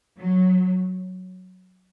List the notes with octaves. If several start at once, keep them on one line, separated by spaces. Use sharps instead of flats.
F#3